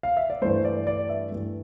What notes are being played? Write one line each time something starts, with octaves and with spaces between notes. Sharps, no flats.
F5
E5
D5
G2 E3 A3 C5
D5
D5
E5
G2 E3 A3